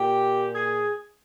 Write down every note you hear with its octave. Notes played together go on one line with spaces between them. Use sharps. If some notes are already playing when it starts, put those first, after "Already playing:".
Already playing: A#2 G4
G#4